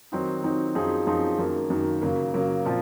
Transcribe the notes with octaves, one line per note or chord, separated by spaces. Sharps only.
D#3 F#3 C4 D#4
D#3 F#3 C4 D#4
F#2 F3 C4 D#4 G#4
F#2 F3 C4 D#4 G#4
F#2 D#3 A#3
F#2 D#3 A#3
C#3 F#3 A#3
C#3 F#3 A#3
A#2 F3 C4 F4